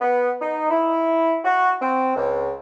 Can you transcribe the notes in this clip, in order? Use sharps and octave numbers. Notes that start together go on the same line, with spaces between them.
B3
D#4
E4
F#4
C4
C#2